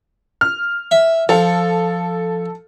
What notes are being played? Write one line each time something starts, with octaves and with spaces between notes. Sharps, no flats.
F6
E5
F3 A4